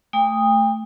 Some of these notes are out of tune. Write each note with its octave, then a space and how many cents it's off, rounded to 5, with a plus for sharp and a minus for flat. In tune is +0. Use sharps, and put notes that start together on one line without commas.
A3 +0 G5 +40 D#6 +0